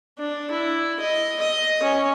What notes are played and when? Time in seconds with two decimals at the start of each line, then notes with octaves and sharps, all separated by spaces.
0.19 D4
0.51 E4
1.00 D#5
1.40 D#5
1.83 C#4